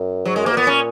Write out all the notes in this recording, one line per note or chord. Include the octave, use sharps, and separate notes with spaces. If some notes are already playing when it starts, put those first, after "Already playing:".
Already playing: F#2
G#2 F#3
F#2 G#3
G#2 A#3
B2
A#2 B3
C#4